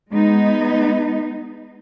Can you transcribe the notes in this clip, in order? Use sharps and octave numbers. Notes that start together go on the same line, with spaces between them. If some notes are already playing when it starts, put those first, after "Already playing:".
G#3 B3 D#4